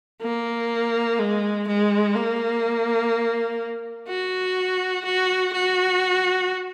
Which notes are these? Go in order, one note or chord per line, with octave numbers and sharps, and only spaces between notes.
A#3
G#3
G#3
A#3
F#4
F#4
F#4